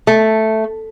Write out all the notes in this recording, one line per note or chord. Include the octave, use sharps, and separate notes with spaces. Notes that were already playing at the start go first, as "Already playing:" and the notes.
A3